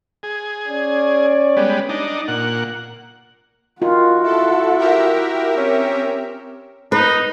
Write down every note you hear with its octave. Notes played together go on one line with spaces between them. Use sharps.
G#4
C#4 D5
G3 G#3 B3
D4 D#4
A#2 F#5
D#3 F4 F#4
E4 A4
G4 A#4 E5
C4 C#4
D#4 B4